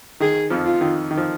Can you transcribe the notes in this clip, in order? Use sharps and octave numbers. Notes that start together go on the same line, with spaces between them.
D#3 G#4
F2 F3
F4
D#3
D#3
F3